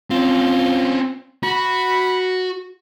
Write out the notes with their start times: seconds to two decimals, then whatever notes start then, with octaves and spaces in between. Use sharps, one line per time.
0.11 C4 C#4 F4
1.44 F#4 B5